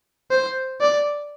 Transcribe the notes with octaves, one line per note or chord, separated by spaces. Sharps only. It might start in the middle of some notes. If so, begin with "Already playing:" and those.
C5
D5